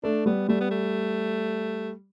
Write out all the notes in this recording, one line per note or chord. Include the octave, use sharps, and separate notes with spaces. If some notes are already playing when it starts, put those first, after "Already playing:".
A3 D4
G3 B3
G3 A3
B3
A3